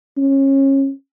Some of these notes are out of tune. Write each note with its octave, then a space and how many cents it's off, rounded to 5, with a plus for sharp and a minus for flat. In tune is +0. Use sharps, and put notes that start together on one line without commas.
C#4 -25